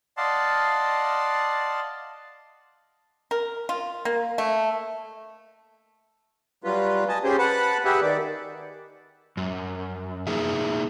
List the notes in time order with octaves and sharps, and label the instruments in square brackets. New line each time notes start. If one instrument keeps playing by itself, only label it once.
[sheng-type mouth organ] D5 D#5 F5 F#5 A5 C6
[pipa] A#4
F4
A#3
A3
[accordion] F#3 G3 F4 B4
D#5 G#5 A5
C#4 G4 G#4 C5
B4 F#5 A5 B5
G4 G#4 B4 E5 F#5
D#3 D5
[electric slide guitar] F#2
A#3 D#4 G#4 E5